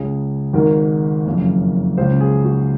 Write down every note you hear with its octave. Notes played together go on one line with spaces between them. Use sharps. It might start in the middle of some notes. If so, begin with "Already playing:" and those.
Already playing: C#2 C#3 G#4
G#1 G#2 D#3 A#4
F#1 F2 C#3
C#2 C#3 C5
G#4
F#4